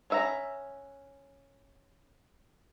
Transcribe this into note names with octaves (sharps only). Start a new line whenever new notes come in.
C#4 B4 E5 F#5 A#5